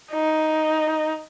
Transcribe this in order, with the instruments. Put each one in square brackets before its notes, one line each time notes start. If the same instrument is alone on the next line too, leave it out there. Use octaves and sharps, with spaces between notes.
[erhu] D#4